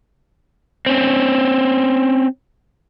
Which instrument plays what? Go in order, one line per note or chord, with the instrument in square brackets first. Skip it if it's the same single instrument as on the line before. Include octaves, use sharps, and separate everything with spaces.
[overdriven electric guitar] C4 C#4